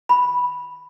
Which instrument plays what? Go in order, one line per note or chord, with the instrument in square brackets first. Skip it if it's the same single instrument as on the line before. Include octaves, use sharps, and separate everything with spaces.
[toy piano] B5